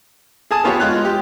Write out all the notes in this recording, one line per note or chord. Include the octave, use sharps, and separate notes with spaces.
G#4 G#5 A5 D#6
A#3 B3 F4 G4 C#5
G#3 F4 F#6
G4